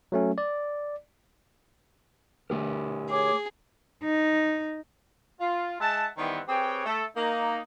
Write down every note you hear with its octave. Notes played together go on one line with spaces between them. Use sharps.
F#3 A3 C#4
D5
A3 G4 A#4
G#4 C#5 D6
D#4
F4
G#3 E5 F#5 A5
D#3 E3 G3 B3 C4
C4 G4 G#4 B4 C#5 G5
A3 A4
A#3 D#4